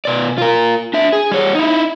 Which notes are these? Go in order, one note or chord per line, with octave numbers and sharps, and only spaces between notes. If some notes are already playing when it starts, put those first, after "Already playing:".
B2 D5
F4 A#4
D4 E5
G#4
G3 C#5
D#4 E4